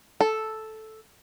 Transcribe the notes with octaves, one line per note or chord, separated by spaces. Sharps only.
A4